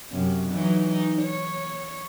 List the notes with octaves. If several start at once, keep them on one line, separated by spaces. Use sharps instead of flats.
F#2 C3
E3 F#3 D#4
D#4
C#5